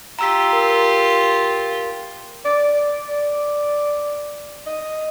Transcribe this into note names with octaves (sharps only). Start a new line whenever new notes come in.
F4 G4 A#5 E6 B6
A#4
D5
D5
D#5